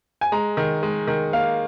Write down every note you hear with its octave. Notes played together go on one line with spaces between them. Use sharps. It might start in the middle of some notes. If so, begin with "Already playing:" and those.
G#5
G#3 A#5
D#3
G#3
D#3
A#3 F5